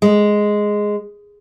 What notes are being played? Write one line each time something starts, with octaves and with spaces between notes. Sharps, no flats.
G#3